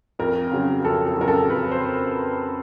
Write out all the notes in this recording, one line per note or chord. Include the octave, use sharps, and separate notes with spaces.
F2 A#4
C#3 F#3
F2 A4
A4
C#3 F#3 A#4
A4
F2 B4
C5